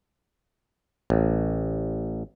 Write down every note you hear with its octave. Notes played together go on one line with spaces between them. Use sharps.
A1